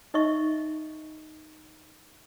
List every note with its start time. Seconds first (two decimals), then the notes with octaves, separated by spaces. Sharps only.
0.14 D#4 D#5 E5 C#6